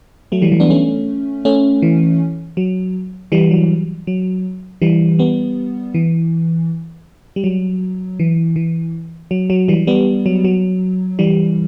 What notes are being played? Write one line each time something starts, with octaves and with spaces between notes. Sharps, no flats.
F#3 A3
E3 G3
E3
B3 D4
A3 C#4
A3 C#4
E3
F#3
E3 G3
F#3
F#3
E3 G3
G3 B3
E3
G3
F#3
E3
E3
F#3
F#3
E3 G3
G3 B3
F#3
F#3
E3 G3